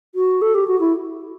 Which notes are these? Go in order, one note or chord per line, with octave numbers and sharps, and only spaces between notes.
F#4
A4
G4
F#4
E4